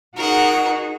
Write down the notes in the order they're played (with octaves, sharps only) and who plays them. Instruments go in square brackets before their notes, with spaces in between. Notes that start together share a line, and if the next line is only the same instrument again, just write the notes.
[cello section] D#4 F#4 G#4 [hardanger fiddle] A#4 F#5